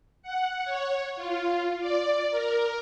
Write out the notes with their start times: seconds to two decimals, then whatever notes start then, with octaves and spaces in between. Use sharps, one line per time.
0.23 F#5
0.65 C#5
1.17 F4
1.80 D5
2.31 A#4